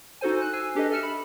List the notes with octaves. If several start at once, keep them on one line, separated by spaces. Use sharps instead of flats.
D#4 F#4 A4 C5 G#5
F#6
G#5 E6 C7
D4 G4 A4 B4 D#5
A4 E5 F6 C#7 E7
B5